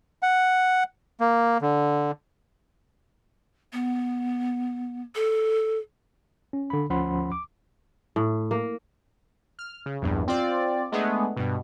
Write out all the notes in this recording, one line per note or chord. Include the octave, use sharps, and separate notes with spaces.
F#5
A#3
D3
B3
A4
C#4
D3 B5
D2 F3 C#4 F#5 B5 C6
D6
A2
A#3
F6
C#3
A#1 E2 G2
C4 F4 D5
G#3 A3 B3 D4 G#4
G2 B2